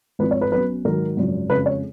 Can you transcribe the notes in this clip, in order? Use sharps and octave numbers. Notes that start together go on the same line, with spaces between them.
G#1 G#2 F3 B4
C#5
B4
B1 B2 F#3 C#4 B4
G#2 D#3 F#3 A#4
G#1 F#2 C#3 F3
F2 C#3 G#3 B4
C#5